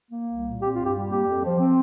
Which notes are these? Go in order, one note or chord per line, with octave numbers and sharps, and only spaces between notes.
A#3
C2
A#2
C4 G4
G2 F4
G4
G3
A#3 G4
F2
F3
C4